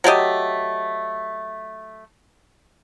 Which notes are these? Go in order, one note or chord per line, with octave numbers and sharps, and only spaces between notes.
F#3 A3 G4 D#5